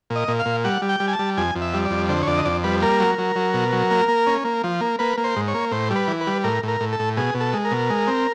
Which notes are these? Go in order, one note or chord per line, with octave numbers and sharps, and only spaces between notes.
A#2
D#5
A#2
F5
A#2
G3 F#5
G3
G5
G3
G#5
A5
G3
F2 G#5
F2
E5
G3
D5
F2
D3 C5
C#5
F2 D5
D#5
F2 D5
G3 B4
A#3 A#4
F#3
F#3
F#3
B2
F#3
A#3
A#3
C#4
A#3
F3
A#3
A#3 B4
A#3
C5
G#2
C#5
A#3
A2 C5
G3
B4
E3
B4
G3
A2 A#4
A2 A#4
A2
A4
A2
B2 G#4
B2
A4
G#3
A#4
B2
G#3
C4